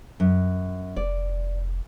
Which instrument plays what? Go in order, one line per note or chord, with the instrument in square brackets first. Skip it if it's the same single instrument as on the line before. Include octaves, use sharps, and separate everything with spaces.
[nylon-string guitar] F#2
[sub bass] F1 [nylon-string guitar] D5